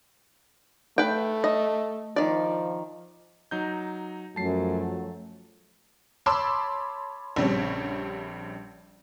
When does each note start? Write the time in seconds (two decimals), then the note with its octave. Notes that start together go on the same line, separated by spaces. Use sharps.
0.98 A3 B4 G5
1.44 D#5
2.16 D#3 F3 D5
3.51 F#3 D#4 G6
4.36 F#2 F3 F#3 A3 A5 C7
6.26 C#5 A5 B5 C6 D6 E6
7.36 A#1 C#3 G3 C4 D4 C#5